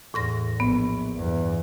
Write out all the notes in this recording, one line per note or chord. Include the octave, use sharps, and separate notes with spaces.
E2 A2 C6 A#6
A#1 B3
E2 G2